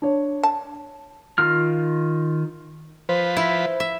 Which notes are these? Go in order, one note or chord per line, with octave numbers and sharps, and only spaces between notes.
D4 C#5
A5
D#3 F4 F6
F3 B4 C5
E4
E5